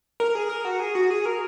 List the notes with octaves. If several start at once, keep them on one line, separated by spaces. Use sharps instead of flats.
A#4
G#4
A#4
F#4
G#4
F#4
G#4
A#4